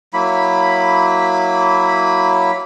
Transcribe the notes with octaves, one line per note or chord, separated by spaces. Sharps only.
F#3 A#3 E4 B5